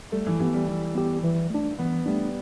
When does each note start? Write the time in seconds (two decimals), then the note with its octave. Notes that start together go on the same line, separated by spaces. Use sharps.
0.12 G3 A3
0.26 E3
0.40 E3 B3 G4
0.54 G3
0.67 E3 G3
0.95 G3 B3 G4
1.24 E3
1.50 A3 D4
1.79 E3 B3
2.06 G3 A3 D4